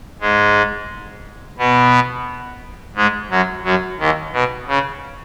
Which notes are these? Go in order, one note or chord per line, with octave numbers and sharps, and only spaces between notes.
G#2 G#3
B2 B3
G#2 G#3
F#2 F#3
F#2 F#3
D#2 D#3
B2
C#3